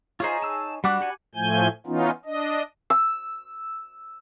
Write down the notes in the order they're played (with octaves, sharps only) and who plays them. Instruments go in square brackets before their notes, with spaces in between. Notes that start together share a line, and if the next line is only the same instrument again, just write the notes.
[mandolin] D#4 G#4 C#5 [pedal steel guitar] F4 C5
[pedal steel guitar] A5 E6
[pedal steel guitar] G3 D6 F#6 [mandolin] D4 F#4 B5
[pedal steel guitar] G4 F#5 G#5
[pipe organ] A2 F3 A3 G#5 G6
E3 B3 C#4 D#4 F4
D4 D#5
[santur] E6